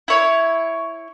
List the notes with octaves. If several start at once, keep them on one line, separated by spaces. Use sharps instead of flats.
E4 C#5